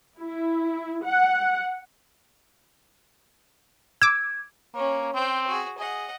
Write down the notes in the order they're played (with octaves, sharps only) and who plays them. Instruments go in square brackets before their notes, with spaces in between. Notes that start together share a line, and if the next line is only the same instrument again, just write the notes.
[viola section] E4
F#5
[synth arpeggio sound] D6 E6 [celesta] G#6
[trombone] A#3 [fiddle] C#4 C#5
[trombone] C4 [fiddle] C5 G5
[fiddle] F#4 G#4
[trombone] G#4 [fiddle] D#5 F#5